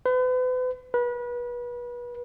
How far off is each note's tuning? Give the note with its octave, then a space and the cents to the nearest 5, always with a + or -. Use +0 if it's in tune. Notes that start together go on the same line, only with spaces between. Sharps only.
B4 +40
B4 -30